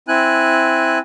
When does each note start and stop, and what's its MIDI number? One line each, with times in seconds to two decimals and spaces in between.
0.08 0.98 60
0.08 0.98 64
0.08 0.98 80
0.08 0.98 90